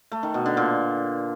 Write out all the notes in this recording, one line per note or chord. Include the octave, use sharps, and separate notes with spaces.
A3
D#3
B2
D3
A#2